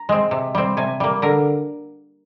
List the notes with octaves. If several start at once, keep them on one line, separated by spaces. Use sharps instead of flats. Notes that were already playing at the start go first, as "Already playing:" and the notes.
Already playing: A#5
G#3 C4
C3
G3 C4
C3 G#5
G3 A#3
D3 A#4